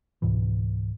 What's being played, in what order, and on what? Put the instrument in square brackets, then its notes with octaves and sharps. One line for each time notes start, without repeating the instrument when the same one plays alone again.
[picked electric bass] C#2 G#2 B2 E3